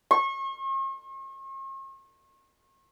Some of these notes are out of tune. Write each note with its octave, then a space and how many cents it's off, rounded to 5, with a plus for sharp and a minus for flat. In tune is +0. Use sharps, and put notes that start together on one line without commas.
C#6 -45